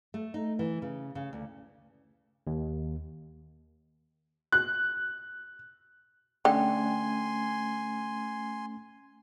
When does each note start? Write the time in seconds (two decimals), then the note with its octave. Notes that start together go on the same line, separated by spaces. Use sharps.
0.14 A3
0.34 D#4
0.59 E3
0.82 C#3
1.15 C#3
1.33 D2
2.47 D#2
4.52 F#6
6.45 D3 A3 C#4 G5 G#5 C6